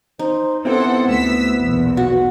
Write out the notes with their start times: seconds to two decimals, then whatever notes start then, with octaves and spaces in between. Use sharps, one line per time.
0.19 D#4 C5
0.65 B3 C4 E4 G4 A4 C5 F#5
1.07 D2 E6 B6
1.60 B1 E2 A#2
1.97 F#4